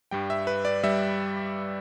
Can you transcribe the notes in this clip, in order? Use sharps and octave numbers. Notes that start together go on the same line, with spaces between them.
G2 G3 G5
E5
B4
D5
G3 E5